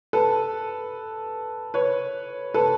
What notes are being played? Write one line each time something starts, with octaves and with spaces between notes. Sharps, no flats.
A4 B4
B4 C#5
A4 B4